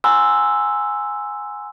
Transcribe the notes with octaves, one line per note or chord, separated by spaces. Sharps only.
F#5 G#5 A#5 C6 E6 F#6